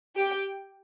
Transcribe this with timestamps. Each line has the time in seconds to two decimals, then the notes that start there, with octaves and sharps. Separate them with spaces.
0.16 G4 G5